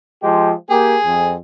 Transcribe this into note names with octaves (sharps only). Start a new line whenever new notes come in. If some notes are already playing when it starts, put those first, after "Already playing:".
F3 G#3 G4
A#3 G4 G#4
F2